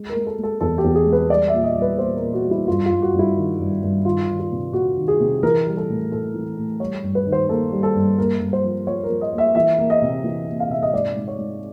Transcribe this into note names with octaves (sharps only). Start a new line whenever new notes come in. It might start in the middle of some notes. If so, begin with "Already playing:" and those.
Already playing: G#3
A#4
G#3
A4
G#3 A4
E2 A4
G4
E2
G#4
G#3
B4
G3 D5
E5
A#2
D#5
G3
B4
A#2 C5
A#2 A#4
F#4
G3
E4
G2 F4
F4
G2
F#4
G2
E4
D#3
G2
G2
D#3 F4
D#3
F4
C3
C3 F#4
D#3
G#4
C3
E3 A#4
G3
A4
A2
A2 A4
E3
A2
G3 C#5
G2
B4
D#3
C5
A#3 A4
G3
A4
G2
A#3 A#4
G2
C5
F3
F3 C#5
A#4
F3
D#5
A#3
E5
E3 E5
A#3
D#5
C3
E3
A#3
F5
C3 E5
D#5
G#2 D5
G#2
C#5
G#2